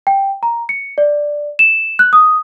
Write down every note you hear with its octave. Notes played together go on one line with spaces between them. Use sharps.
G5
A#5
C#7
D5
E7
F#6
D#6